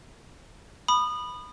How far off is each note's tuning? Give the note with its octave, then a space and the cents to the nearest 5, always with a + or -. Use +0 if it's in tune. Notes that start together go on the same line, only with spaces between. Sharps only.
B5 +0 D#6 -25